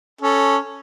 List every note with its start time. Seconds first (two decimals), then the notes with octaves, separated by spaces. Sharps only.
0.21 C#4 A4